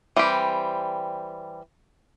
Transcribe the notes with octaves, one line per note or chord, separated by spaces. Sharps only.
E3 G3 C4 G4